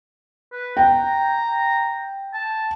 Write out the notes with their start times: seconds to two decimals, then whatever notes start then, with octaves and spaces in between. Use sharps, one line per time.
0.52 B4
0.77 G5 A#5
2.34 A5